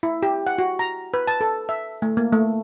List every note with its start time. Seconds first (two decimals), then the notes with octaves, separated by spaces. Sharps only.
0.03 E4
0.23 G4
0.47 F#5
0.58 F#4
0.79 A#5
1.14 B4
1.27 A5
1.41 A4
1.69 E5
2.02 A3
2.17 A#3
2.33 A3